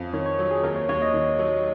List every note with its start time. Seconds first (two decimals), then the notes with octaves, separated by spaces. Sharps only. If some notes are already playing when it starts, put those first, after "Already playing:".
Already playing: F2 C#4 F5
0.13 D#3 C#5
0.26 C#5
0.39 F#3
0.51 G#4
0.63 D#2 A#4
0.76 C#5
0.89 D#2 C#5
1.02 D#5
1.14 D#3
1.39 F#3